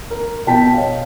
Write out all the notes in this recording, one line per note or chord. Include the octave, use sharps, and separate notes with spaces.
A#4
B2 G5 A5 B6
C#5 D#5 F5